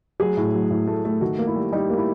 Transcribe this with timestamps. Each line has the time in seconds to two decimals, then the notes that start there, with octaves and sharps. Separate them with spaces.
0.20 F#3 G#4
0.37 A2
0.54 F#3
0.70 A2
0.87 A3
1.05 A3
1.21 D#3 F#4
1.39 A#3
1.47 E4
1.56 G3
1.72 G3 D#4
1.90 A#3
1.97 E4